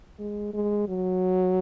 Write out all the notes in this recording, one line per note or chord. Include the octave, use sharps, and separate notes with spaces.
G#3
G#3
F#3